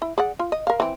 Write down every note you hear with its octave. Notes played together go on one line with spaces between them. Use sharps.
E4
G#4 D5 F#5
F4
D#5
A#4 F5
E3 C4